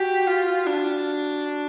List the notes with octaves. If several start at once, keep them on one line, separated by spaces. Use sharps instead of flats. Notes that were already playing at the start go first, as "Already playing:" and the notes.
Already playing: F#4 G4
F4
D4